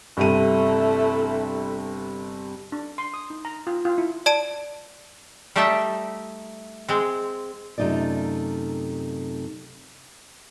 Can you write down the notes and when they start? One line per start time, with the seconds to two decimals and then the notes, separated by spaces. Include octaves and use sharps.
0.17 G1 C3 A3 E4 D#7
2.72 D4
2.98 C6
3.14 D#6
3.30 D#4
3.45 A#5
3.67 F4
3.85 F4
3.98 E4
4.26 D5 A5 D7
5.56 G3 A3 D#4 E5 G5 A5
6.88 G#3 C4
7.78 F#2 C3 A3 D#4 F4 D5